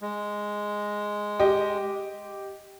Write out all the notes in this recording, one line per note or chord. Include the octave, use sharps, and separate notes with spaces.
G#3
G4 D#5 G5